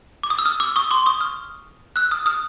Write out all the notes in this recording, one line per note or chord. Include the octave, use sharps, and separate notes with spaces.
D6
D#6
E6
D#6 F6
D6 E6
C#6 D#6
C6 D6
C#6 D#6
D#6 F6
E6 F#6
D#6 F6
D#6 F6